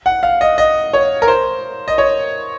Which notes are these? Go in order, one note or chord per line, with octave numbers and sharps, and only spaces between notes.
F#5
F5
D#5
D#5
C#5
A#4
C5
D#5
C#5